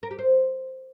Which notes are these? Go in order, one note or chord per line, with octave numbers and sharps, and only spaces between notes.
A#4
G4
C5